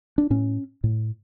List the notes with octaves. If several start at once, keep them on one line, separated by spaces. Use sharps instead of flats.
D4
A2 C#4
A2